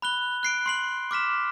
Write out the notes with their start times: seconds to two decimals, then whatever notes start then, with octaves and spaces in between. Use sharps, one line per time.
0.02 B5 F#6 G7
0.43 F#6 C7 D7
0.66 C6 C7 F#7
1.11 D6 F6 B6 E7